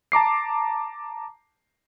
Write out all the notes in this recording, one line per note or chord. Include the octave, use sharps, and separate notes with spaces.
A5 A#5 D6 C7